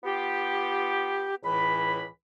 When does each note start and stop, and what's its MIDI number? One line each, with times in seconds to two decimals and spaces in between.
0.04 1.34 59
0.04 1.34 65
0.04 1.34 67
1.43 2.03 37
1.43 2.03 45
1.43 2.03 52
1.43 2.03 83